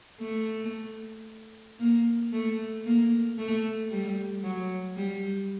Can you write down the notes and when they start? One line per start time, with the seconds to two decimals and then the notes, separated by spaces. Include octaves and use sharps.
0.20 A3
1.80 A#3
2.32 A3
2.86 A#3
3.38 A3
3.91 G3
4.43 F#3
4.96 G3